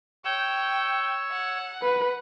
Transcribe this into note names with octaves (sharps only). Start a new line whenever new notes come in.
C#5 G5 E6
F#5
B4